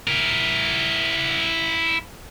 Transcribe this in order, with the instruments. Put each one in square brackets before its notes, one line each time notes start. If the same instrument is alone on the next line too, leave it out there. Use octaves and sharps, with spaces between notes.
[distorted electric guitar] E4 A#4